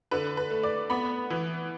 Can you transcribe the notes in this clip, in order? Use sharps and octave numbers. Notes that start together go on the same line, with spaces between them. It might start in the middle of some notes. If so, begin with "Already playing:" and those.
D3 B4
B4
A3
D5
B3 B5
E3